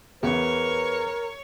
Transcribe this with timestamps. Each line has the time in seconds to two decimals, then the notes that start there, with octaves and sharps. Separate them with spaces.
0.23 E2 A#4 B4 C#5